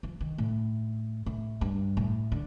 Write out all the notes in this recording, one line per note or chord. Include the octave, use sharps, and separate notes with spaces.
F3
D#3
A2
A2
G2
A2
D3